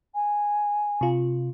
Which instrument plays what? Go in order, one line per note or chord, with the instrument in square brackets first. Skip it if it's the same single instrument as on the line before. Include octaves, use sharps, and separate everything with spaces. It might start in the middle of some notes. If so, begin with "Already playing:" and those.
[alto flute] G#5
[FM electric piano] C3 F4